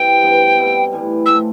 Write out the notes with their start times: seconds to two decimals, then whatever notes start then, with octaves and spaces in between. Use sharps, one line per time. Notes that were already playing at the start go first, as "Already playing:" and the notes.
Already playing: C3 E3 G3 C4 G5
0.22 G2 F3 B3
0.57 B2 G3 C4 E4
0.91 A2 E3 G3
1.26 A2 F3 A3 E6